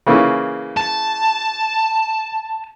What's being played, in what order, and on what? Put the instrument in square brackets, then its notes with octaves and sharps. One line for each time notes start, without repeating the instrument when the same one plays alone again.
[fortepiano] C#3 E3 A#3
[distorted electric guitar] A5